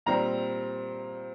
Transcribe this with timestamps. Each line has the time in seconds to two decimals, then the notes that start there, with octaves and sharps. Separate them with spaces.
0.06 A#2 G3 C4 A#5